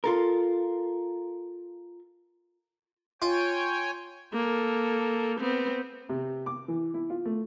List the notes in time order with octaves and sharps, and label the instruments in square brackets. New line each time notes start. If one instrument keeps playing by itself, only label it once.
[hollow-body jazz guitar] F4 A4 A#4
[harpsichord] F4 [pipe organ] C#5 G5 G#5
[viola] A#3 A4
B3 C4
[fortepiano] C3
D6
E3
E4
F4
A3